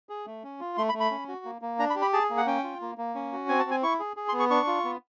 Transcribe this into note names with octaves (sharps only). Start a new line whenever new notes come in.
G#4
A3
C#4
F4
A3 C6
B5
A3
B5
C#4
F#4
A#3
A#3
D4 A#5
B5
G4
B5
G#4 A5
A#3
F#5
C#4 G5
F4
A#3
A#3
C#4
F#4
C4 G#5
A5
C4
G#5
E4 C#6
G#4
G#4
C6
B3
C#6
D4 C#6
F4
B3